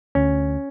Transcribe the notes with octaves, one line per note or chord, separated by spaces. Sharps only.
D2 C#4